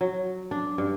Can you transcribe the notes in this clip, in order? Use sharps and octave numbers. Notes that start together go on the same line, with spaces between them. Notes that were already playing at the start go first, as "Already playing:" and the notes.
F#3
D4
G2